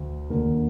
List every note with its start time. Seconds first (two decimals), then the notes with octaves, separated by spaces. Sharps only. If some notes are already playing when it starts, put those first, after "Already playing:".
Already playing: D2
0.30 D#2 D3 A#4